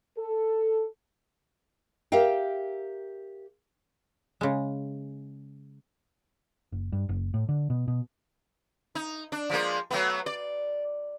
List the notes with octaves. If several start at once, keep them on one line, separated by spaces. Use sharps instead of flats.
A4
G4 A#4 E5 F5 G5
C#3 G#3
F#1
G2
F#1
A2
D3
B2
B2
D#4
D4
F3 G#3 A#3
F#3 A3 B3
D5